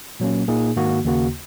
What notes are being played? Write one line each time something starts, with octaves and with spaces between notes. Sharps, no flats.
A#2 F#3 A#3 C#4
A#2 A#3 D#4 G#4
G#2 D#3 A#3 F#4
D#2 C#3 A#3 F#4